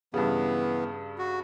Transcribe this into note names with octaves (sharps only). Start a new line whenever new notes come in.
G2 C#3 E3 B3
F#4